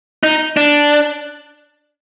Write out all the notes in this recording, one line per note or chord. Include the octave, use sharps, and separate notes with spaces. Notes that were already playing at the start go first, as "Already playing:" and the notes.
D#4
D4